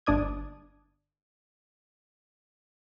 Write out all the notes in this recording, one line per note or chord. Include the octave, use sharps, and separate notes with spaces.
G1 D4 D5 D#6 G#6